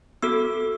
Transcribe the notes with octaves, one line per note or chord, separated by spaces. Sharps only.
B3 F#4 A4 E6